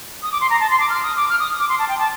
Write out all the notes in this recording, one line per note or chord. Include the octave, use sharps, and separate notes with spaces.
D#6
D6
C6
A#5
A5
C6
D6
F6
D#6
D6
F6
D#6
D6
C6
A5
G5
A5